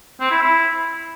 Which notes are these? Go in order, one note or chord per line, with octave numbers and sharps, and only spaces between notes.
C4
E4
E4